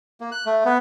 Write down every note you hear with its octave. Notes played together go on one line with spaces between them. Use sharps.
A#3
F#6
A3
B3